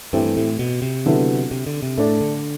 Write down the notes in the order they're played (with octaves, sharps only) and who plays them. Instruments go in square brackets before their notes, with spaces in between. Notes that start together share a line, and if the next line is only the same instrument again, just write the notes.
[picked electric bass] G2 [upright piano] E3 A3 C4 G4
[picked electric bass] A2
B2
C3
[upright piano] D3 F#3 B3 E4
[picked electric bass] C3
D3
C3
[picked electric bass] A2 [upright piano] A3 D4 A4 D5
[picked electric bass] D3